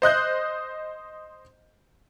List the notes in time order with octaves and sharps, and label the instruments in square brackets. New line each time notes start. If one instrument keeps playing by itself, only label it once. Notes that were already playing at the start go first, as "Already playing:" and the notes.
[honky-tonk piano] C5 D#5 F#6 G6